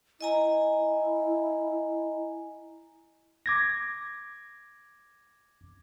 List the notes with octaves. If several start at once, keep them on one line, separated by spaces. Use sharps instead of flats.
E4 D#5 G#5 A#5
D6 G#6 A#6